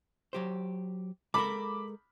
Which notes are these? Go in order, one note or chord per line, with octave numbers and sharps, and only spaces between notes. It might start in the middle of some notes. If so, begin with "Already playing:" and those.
F#3 G4 C5
G#3 A4 A#4 B5 D6